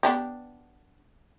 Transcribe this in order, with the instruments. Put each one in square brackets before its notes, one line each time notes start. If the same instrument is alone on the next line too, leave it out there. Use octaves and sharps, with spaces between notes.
[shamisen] B3 D4 G4